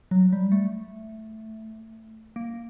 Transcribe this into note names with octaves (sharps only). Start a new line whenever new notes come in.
F#3
G3
A3
A#3